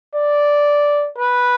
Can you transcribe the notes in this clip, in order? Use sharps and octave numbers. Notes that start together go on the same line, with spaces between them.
D5
B4